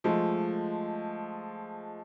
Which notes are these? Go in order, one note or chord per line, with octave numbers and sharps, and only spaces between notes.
F3 G#3 A3